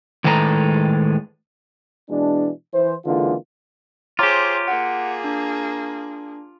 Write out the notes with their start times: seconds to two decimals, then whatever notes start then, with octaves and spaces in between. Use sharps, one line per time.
0.24 A2 D#3 G#3 A4 B4 A#5
2.10 B2 E3 G#3 D4
2.73 E3 C5
3.06 C#2 D3 E3 G#3 A#3 F4
4.19 F4 G4 G#4 C5 C#5 A#5 D6
4.68 A#3 G#4 F#5
5.24 D4